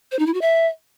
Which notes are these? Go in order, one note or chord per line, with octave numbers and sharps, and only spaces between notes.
C5
D#4
E4
F#4
E5